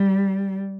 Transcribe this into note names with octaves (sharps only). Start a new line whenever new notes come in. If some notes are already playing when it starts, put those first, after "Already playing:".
Already playing: G3